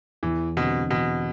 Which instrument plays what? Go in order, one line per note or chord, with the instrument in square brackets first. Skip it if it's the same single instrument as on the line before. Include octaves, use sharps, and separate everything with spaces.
[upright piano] E2 [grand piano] E3
[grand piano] B2 [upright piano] D3 G3 C4
[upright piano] E2 [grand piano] B2